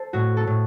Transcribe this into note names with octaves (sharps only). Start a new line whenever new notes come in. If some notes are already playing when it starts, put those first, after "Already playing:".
Already playing: A4 C5
A2 F#4
A4
A2